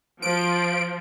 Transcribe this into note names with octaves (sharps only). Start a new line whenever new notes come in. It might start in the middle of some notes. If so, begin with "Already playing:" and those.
F3 D7